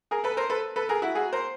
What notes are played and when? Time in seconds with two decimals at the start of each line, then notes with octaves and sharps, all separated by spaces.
0.11 G#4 A#4
0.24 A4 B4
0.37 A#4 C5
0.50 A4 B4
0.76 A4 B4
0.89 G#4 A#4
1.02 E4 F#4
1.15 F#4 G#4
1.33 A#4 C5